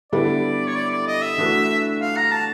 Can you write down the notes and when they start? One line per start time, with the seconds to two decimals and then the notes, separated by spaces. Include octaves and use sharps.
0.12 D3 G3 B3 E4 A4 D5
0.67 C#5
0.75 D5
0.91 D5
1.07 D#5
1.22 E5
1.38 E3 A3 D4 F#4 B4
2.01 F5
2.16 A#5
2.31 A5